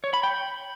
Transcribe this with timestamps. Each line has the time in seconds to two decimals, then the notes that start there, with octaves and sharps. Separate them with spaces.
0.04 C#5
0.14 B5
0.23 G5